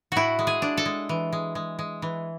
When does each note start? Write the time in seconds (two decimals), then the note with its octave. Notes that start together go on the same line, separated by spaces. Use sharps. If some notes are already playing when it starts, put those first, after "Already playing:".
0.12 A2 E4 F#4
0.39 G#3
0.47 G#4
0.62 D4
0.77 A4
0.86 G#3
1.09 E3
1.33 G#3
1.55 G#3
1.79 G#3
2.02 E3